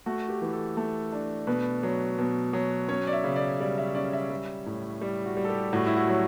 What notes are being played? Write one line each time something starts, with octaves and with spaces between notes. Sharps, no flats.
A3 F#4
G4
E3
A4
A3
D4
B2 B4
F#3
B2
F#3
C#4 C#5
D5
E5
C#3
D5
G3 D5
E5
C#4 D5
E5
G3
A2
G3 D5
F#4
G3
A4
G4
A2 F#4
E4
F#4
F#3